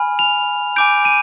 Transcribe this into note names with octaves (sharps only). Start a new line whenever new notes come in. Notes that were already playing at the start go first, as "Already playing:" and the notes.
Already playing: G#5 B5 F6
F7
G#5 D6 G6 D7
D#7